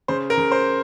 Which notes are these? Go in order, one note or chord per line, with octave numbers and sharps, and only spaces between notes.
C#3 C5
A#4
C#3
C5